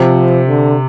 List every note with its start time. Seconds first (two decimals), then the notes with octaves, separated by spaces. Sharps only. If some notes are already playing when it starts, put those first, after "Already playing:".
Already playing: C3 F3
0.48 D3